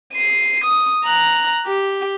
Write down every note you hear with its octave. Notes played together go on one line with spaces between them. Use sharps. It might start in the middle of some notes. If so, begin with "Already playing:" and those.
C7 D#7
D#6
A#5 F#6
G4